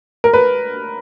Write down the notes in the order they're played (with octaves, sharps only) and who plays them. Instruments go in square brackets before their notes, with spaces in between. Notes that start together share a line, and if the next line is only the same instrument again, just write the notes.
[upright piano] A#4
B4